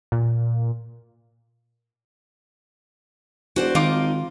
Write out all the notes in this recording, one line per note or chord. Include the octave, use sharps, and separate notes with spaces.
A#2
E1 F#4 C5 D5
G#1 D#3 D#4 F4 D6